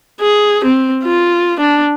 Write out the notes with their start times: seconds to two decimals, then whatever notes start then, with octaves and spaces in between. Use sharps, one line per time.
0.20 G#4
0.65 C4
1.04 F4
1.60 D4